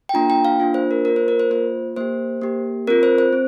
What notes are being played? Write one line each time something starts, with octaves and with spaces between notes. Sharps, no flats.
G5
A#3 D4 F4 A#5
G5
F5
A#3 D4 F4
C5
A#4
A#3 F4 A#4
C5
A#4
C5
A#3 F4 C5
A#3 G4 C5
A#3 G4
C4 F4 A#4
C5
C5
C4